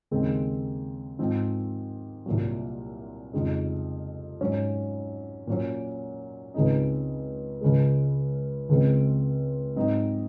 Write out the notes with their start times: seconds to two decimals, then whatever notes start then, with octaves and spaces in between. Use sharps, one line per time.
0.11 D#2 C#3 G#3 C4
1.19 G#2 F3 C4
2.26 C2 A#2 F#3
3.33 F2 C#3 G#3 D#4
4.41 G#2 F#3 C#4
5.47 A#2 F#3 C#4
6.54 C#2 C#3 G#3 C4 D#4
7.61 C#2 C#3 G#3
8.69 C#2 C#3 G#3 C4
9.76 G#2 F#3 C4 D#4